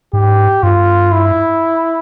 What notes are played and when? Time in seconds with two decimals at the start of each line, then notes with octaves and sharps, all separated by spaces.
0.13 G#2 G4
0.63 G2 F4
1.12 E4